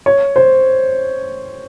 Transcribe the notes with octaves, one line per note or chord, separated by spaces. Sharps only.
C#5
C5